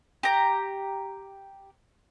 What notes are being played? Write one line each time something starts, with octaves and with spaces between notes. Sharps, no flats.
G4 A#5